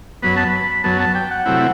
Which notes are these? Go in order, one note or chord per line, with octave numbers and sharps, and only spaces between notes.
F#2 F#3 B3 B5
A5
B5
F#2 F#3 B3 A5
A5
G5
F#5
C3 F#3 A3 C4 E4